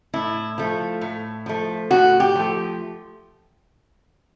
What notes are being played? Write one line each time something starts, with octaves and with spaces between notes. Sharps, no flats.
A2 E4
F3 A3
A2
F3 A3
A2 F#4
G4
F3 A3